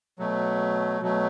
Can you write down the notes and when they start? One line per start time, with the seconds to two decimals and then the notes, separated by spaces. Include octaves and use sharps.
0.19 B2 F#3 A3
1.01 B2 F#3 A3